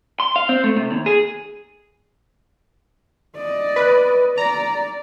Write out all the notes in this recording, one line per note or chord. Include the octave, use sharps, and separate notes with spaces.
C6
F5
C4
A3
C3
D#2
G#4
D5 D#5
B4
D5 A#5